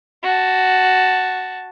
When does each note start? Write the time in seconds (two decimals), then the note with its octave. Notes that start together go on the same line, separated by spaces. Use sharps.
0.23 F#4 A5